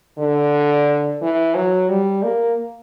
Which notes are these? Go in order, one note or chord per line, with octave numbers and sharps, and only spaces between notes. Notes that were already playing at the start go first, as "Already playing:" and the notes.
D3
E3
F#3
G3
A#3